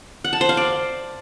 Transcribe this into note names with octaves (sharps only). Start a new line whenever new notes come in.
F#5
A5
C5
F5
D5